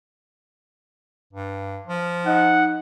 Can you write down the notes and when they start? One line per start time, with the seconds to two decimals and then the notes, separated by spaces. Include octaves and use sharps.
1.33 G2
1.87 F3
2.27 D#4 F#5